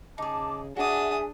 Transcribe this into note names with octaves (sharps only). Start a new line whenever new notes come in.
C#3 D#4 G#4 A5 D6
D4 F#4 G#4 E5 G#5 D6 D#6